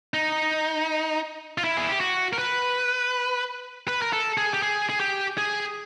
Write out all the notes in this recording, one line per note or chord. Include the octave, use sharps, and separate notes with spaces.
D#4
F4
E4
G#4
G4
F#4
A#4
B4
B4
A#4
A4
G#4
G4
G#4
G#4
G4
G#4